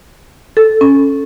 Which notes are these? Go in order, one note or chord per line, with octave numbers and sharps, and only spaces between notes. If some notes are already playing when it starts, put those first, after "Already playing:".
A4
C#4